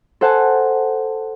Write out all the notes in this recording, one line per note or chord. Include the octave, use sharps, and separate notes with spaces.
A4 C5 F#5 G#5 A5